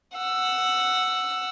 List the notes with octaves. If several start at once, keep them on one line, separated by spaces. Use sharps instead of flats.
F#5 E6